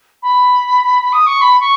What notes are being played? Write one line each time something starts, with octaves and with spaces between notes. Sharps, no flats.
B5
D#6
C#6
B5
C#6